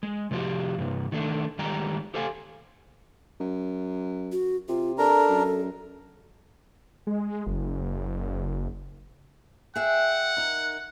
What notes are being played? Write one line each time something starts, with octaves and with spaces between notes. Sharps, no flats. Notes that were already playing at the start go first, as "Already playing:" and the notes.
G#3
C3 F3 A3 F#4 G4
G2 C3
D#3 A3 D4
D#3 G3 G#3 D5 G5 A#5
G4 A4 C5 F5 G#5
F#2
F#4
C3 F4
D4 A4 A#4 A#5
F#2
G#3
F#1
G#4 E5 F#5 G5
D#4 A#4